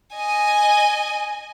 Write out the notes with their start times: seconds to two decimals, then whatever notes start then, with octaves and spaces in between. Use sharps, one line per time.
0.14 D#5 G#5